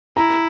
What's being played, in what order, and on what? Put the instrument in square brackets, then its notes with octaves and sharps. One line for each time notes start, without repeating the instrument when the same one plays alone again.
[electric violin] E4 [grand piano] A#5